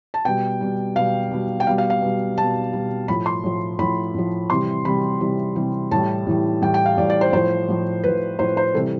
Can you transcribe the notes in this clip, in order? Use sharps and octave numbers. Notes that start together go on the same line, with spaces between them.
A5
B2 G3 G5
B2 G3
B2 G3 F5
B2 G3
G5
B2 G3 F5
F5
F5
B2 G3
B2 G3 A5
B2 G3
A2 F3 B5
C6
A2 F3
A2 F3 B5
A2 F3
C3 E3 G3 C6
C3 E3 G3 B5
C3 E3 G3
C3 E3 G3
A2 E3 G3 A5
A2 E3 G3
A2 E3 G3 G5
G5
F5
A2 E3 G3 D5
D5
C5
A2 F3 C5
A2 F3
A2 F3 B4
A2 F3 C5
C5
C3 E3 G3 A4